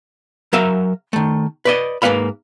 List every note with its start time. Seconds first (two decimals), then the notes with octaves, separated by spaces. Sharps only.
0.53 F#3 A#4 E5 F5
1.13 D#3 A3
1.65 B4 D5 D#5
2.02 G#2 A#3 F#4 B4 F5 B5